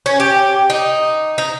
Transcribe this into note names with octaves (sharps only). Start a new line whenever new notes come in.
C#4
G4
D#4
D#4